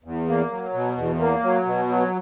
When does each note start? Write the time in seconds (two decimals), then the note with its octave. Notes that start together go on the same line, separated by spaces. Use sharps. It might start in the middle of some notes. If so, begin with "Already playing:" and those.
0.04 E2
0.28 A#3
0.51 F#3
0.73 B2
0.97 E2
1.19 A#3
1.43 F#3
1.66 B2
1.89 F#3